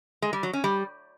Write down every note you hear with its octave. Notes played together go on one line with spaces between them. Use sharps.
G#3
G3
F#3
C#4
G3